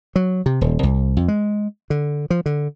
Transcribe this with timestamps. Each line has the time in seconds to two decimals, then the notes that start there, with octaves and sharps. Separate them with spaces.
0.16 F#3
0.46 C3
0.61 D#1
0.83 C2
1.17 F2
1.28 G#3
1.90 D3
2.30 F3
2.46 D3